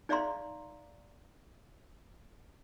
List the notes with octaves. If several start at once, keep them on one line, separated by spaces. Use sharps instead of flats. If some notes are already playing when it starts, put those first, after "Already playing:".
D#4 D5 E5 F5 A#5 C6